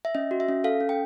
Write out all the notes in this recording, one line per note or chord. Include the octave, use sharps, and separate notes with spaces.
E5
C#4 D#5
F#4
E5
C#4
A4 F5
C#4
G5